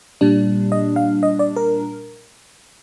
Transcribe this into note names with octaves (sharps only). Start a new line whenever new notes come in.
A#2 G3 D4
D#5
F5
D#5
D5
A#4